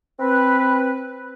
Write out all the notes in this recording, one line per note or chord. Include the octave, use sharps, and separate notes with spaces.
C4 B4